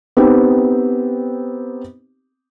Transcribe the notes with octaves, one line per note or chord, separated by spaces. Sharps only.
B3 C4 D#4 G4